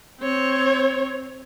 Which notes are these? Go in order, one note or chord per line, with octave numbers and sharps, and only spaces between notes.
C4 C#5